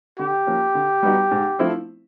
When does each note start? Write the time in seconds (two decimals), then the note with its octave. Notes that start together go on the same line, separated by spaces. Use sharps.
0.19 D3 G4
0.47 F3 A#3 C#4
0.75 D3
1.03 G3 B3 D#4 F#4
1.31 G#2
1.59 F3 A3 C4 E4